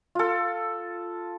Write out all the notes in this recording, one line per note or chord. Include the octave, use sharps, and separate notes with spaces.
F4 A4